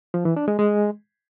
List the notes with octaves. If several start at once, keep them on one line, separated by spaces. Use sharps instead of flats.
F3
E3
D4
G#3
G#3